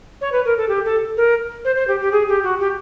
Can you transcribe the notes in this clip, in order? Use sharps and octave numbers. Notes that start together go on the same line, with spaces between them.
C#5
B4
A#4
A4
G4
A4
A#4
C5
C5
G4
G4
G#4
G4
F#4
G4